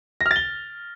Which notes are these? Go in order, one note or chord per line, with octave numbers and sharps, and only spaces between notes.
A#6
F6
A6
G7